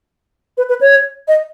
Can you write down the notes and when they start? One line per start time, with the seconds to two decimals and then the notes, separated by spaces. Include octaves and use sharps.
0.58 B4
0.69 B4
0.81 C#5
1.28 D#5